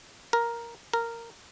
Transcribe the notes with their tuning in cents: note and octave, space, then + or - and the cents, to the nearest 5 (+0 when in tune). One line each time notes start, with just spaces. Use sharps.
A#4 +5
A#4 -10